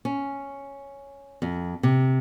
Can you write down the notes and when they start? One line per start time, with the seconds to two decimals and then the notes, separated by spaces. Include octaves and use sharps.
0.05 C#4
1.42 F2
1.83 C3